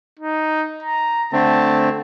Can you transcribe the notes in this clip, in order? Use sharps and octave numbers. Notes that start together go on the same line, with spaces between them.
D#4
A#5
D3 A3 C4 A5